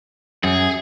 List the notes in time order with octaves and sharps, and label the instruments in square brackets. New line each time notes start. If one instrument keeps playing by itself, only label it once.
[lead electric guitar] F#2 [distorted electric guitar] G#4